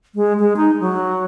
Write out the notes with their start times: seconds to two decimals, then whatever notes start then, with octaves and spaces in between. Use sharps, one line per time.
0.15 G#3
0.40 G#3
0.57 D#4
0.80 F#3